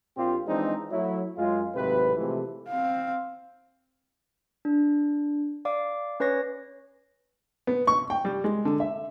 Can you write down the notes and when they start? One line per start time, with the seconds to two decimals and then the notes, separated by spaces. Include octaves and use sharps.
0.17 A#1 A#2 C4 F4 G4
0.47 E3 F3 G#3 C4 D4 D#4
0.91 F#3 A3 E4
1.38 F#2 G#3 F4
1.75 G#1 A2 C3 F#3 B4
2.17 C3 E3 F3 G#3 A3
2.68 C4 F5
4.65 D4
5.65 D5 F5 D6
6.20 C#4 B4 C#5 C#6 A#6
7.67 B3
7.87 C#6
8.10 G5
8.25 G3
8.44 G#3
8.65 D3
8.80 E5